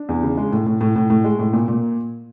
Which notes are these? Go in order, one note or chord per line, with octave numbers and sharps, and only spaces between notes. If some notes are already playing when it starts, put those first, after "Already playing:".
Already playing: D4
E2
C#3
G#3
A2
A2
A2
A2
A2
G#3
A2
A#2
A#2